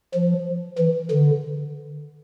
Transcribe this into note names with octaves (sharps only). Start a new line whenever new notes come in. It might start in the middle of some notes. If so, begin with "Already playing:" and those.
F3
E3
D3